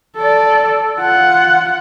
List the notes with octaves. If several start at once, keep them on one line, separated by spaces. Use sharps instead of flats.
A4 D5
F4 F#5